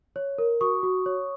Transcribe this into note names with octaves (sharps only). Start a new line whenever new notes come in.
C#5
A#4
F#4 C#6 D#6
F#4
C#5